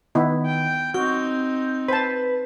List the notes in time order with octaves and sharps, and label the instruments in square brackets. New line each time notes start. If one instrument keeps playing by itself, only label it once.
[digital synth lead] D#3 [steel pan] B3 E4
[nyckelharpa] G5
[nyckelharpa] C4 D#4 [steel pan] F#4 [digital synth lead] G6
[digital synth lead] B4 [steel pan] C5 A5